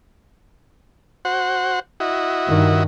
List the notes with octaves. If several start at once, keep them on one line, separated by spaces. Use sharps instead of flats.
F#4 C5 F#5
E4 F#4 D#5
G2 D#3